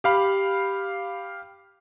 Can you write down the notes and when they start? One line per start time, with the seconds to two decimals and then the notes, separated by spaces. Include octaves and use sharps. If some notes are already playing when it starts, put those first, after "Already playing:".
0.04 G4 F5 B5